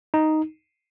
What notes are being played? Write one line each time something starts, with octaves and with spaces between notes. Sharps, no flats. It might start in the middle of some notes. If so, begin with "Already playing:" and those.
D#4